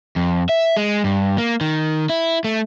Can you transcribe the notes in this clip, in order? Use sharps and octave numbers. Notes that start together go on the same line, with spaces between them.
F2
E5
G#3
G2
A#3
D#3
E4
A3